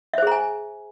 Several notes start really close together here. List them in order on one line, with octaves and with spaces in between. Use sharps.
E5 C5 G#4 A#5 G#5